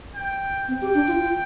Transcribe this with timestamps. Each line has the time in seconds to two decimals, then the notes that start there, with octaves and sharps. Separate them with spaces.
0.15 G5
0.68 C4 G5
0.82 G4
0.94 D4
1.08 F4
1.21 F4